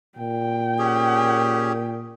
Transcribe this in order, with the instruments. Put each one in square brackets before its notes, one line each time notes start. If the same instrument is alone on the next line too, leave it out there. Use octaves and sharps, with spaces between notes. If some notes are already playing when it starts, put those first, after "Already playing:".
[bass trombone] A#2 [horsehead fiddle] G5
[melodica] C#4 G4 G#4